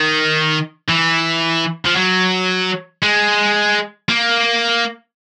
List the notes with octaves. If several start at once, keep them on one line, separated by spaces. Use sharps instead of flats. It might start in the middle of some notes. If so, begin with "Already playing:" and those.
Already playing: D#3
E3
F3
F#3
G#3
A#3